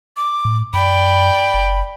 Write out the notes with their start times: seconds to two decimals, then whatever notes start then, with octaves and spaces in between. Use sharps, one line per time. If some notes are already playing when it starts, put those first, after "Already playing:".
0.17 D6
0.45 A2
0.74 F#2 D5 G5 B5
1.54 F#1